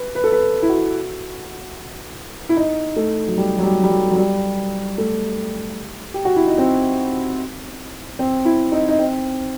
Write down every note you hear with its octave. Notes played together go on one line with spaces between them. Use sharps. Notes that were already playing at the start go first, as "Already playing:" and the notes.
Already playing: B4
B4
A4
B4
E4
F#4
E4
D#4
A3
F#3
G3
F#3
G3
G3
F#3
F#3
G3
A3
G4
F#4
E4
D#4
C4
C4
E4
D#4
D#4
C4